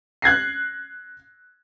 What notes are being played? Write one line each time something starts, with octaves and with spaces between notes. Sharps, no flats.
F#6 G#6 A#6 C7